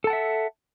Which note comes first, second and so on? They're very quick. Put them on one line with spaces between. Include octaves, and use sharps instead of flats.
A4 A5 F#5 E5